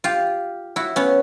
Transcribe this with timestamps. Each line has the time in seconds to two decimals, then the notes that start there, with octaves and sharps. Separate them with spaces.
0.04 F4 G4
0.76 E4 F#4
0.96 B3 C#4